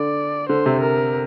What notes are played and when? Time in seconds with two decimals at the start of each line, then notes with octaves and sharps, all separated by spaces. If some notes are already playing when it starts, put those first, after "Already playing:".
Already playing: D3 D5
0.49 D3 C5
0.66 C3
0.81 A#4